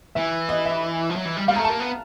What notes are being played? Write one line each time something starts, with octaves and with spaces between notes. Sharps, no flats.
E3 E5
D#5
E5
F3
F#3
E3
G3
G3 F5
G#3 A3 A#5
A5
A#3
B3